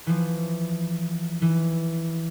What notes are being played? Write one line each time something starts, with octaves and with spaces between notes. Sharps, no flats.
E3 F3
E3